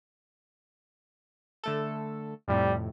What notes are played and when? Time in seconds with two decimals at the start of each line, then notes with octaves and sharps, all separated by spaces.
1.63 D3 A3 A4
2.48 F2 A2 C3 G3